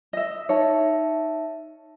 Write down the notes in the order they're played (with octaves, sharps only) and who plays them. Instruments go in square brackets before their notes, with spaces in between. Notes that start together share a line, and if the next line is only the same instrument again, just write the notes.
[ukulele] D#5 E5
[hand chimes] D#4 E5 A5 [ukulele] C#5